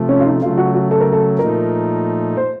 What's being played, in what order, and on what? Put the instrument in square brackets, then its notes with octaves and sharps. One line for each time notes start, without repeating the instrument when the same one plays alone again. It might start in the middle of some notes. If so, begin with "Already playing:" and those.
Already playing: [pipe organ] C3 F3 A3
[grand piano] C#4
F4
D#4
[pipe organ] C#3 F#3 A3 [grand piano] F4
[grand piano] F#4
F#4
A4
A#4
A4
[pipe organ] A#2 F3 A3 D#4 [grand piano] A#4
[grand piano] C5